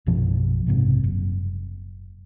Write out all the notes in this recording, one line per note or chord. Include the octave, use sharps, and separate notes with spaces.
A#1 F#2 B2 F3
B1 G#2 C3
F#1